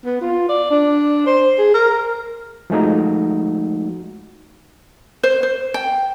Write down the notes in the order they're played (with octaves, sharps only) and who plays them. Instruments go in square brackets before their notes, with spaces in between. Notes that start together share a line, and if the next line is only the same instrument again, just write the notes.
[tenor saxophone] B3
F4
D5
D4
C5
G#4
A#4
[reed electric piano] F3 G#3 A3 D#4 F#4
[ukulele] C5
C5
G5